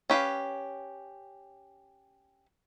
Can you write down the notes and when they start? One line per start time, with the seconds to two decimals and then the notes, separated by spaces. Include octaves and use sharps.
0.10 C#4 G4 B4 F5